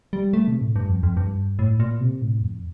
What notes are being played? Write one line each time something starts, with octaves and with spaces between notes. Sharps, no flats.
G3
A3
C3
A2
G2
F2
F2
G2
A2
A#2
C3
A2
F2